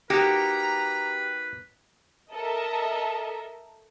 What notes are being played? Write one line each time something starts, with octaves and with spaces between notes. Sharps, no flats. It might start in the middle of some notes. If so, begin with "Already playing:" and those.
A#3 D#4 F#4 G4 B4 A#5
A4 A#4 D#5 E5